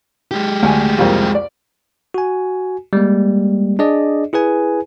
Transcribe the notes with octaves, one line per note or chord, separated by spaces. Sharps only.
G#3 G4
D2 G#5
C2 F2 A#3
D5
F#4 G#5
G3 G#3 A#3
D4 G#4 D5 D#5
E4 G#4 B4 G#5